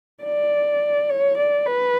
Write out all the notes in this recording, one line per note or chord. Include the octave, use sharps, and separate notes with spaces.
D5
C#5
D5
B4